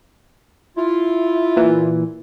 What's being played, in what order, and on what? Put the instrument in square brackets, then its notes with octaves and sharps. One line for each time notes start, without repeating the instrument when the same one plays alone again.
[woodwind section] E4 F4
[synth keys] A#2 E3